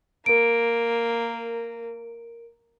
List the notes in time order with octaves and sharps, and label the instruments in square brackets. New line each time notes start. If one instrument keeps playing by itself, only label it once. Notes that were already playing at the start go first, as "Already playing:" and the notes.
[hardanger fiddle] A#3 [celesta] A#4 D7